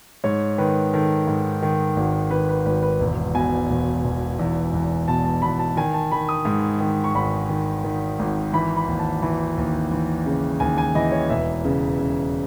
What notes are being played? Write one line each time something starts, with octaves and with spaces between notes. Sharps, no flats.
G#2 C#5
D#3 B4
D#3 A4
G#2
D#3
G#1
D#3 B4
B4
G#1 B4
B4
E1
B2 G#5
E1
E1
E2
E2
B2 A5
A5
E2 B5
A5
D#3 G#5
A5
D#3 B5
D#6
G#2
D#3
C#6
G#1 B5
D#3
D#3
G#1
E3 B5
B5
D#2
A5
E3
D#2
E3
C#3
D#2 G#5
G#5
E3 D#5
C#5
E1 E5
C#3
C#3